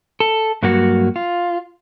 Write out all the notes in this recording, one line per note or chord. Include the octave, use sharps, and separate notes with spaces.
A4
G2 F#3 A#3 F#4
F4